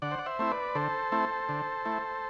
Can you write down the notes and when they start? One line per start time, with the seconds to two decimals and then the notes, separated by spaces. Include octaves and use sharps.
0.02 D3 D5 F#5
0.11 C5
0.19 D5
0.26 C5 E5
0.39 A3 C4 E4
0.51 B4 D5
0.75 D3 A4 C5
1.12 A3 C4 E4
1.49 D3
1.85 A3 E4